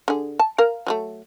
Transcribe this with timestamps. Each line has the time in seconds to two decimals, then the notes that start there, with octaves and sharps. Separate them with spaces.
0.08 D3 G#4
0.40 A5
0.58 A#4 F5
0.87 F#3 G#3 A3